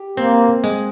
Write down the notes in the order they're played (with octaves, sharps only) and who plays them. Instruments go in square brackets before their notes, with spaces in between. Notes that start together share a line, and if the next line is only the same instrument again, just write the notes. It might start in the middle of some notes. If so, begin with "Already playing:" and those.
Already playing: [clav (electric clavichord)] G4
[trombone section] A#3 [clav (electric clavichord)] C4
[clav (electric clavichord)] G#3